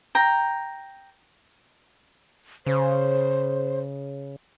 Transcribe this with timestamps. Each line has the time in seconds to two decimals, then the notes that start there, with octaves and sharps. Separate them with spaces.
0.15 G5 A#5
2.67 C#3 C5